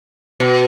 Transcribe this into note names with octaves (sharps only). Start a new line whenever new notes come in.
B2